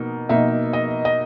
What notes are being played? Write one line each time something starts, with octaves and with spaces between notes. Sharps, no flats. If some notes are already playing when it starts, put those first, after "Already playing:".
Already playing: B2 A#3 D#4
B2 A#3 D#4 E5
D#5
D#5